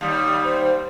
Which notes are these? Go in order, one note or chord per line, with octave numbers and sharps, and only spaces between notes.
D#2 G3 D#6
C5